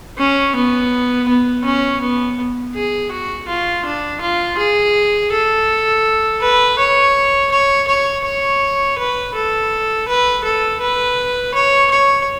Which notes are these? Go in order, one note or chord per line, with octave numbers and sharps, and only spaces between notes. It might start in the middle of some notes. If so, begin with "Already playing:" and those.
C#4
B3
B3
C#4
B3
G#4
F#4
F4
D4
F4
G#4
A4
B4
C#5
C#5
C#5
C#5
B4
A4
B4
A4
B4
C#5
C#5